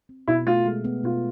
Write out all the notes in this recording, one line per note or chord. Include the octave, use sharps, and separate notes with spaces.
C4
B2 E4
A3 F4
G#3
B3
B2 F4